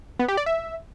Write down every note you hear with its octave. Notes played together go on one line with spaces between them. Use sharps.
B3
G4
D5
E5